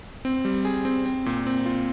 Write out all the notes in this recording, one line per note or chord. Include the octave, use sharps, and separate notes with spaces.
C4
G3
G#4
C4
C4
A#2
C4
F4